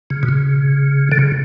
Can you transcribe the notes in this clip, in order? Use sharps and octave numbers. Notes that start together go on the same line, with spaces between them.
C#3
B2
C#3
D3
C#3